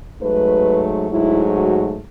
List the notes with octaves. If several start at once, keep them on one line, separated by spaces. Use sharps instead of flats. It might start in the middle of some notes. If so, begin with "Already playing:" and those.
G#2 F#3 A3 B4
G#2 F#3 A3 E4
F#4